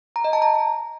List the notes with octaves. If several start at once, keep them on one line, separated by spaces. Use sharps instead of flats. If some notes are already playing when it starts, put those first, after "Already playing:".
A#5
D#5
A5
A#5